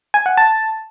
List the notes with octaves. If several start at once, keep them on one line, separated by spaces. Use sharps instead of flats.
G#5
F#5
A5